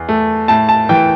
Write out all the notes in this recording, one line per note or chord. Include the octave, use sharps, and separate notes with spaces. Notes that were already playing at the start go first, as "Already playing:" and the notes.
Already playing: E2
A3
A2 A5
A5
E3 G5